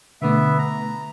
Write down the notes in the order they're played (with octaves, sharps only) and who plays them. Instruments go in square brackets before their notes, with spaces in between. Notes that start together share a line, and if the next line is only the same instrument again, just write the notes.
[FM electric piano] B2 D3 A3 [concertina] B3 E5
[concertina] A#5